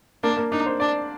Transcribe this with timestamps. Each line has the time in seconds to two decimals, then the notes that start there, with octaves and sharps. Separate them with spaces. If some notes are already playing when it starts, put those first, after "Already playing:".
0.23 A#3 D4
0.37 A#3
0.52 D4 D#4
0.66 C5
0.80 D4 D5